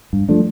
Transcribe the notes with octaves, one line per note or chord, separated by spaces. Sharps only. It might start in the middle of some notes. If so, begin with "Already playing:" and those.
G2
F3 A3 D4